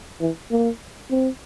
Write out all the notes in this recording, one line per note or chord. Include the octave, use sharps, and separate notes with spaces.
E3
A#3
C4